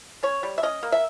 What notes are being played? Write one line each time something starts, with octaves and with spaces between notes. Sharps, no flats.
C#4 C#5
G3
E5
C#4 D#5
A#3
E5